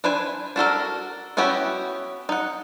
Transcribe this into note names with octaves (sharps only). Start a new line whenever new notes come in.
D4 B4 C5 G#5
D4 F#4 A4 A#4
B3 C#4 E4 F#4 G4
D#4 F#5